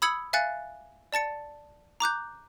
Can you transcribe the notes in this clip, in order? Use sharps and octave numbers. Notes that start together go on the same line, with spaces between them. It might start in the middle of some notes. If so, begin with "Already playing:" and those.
B5 D#6 E6 G#6 C#7 F#7
E5 F5 G#5 F#6 A6 C#7
D5 A5 A6 C#7
A#5 D6 F#6 G6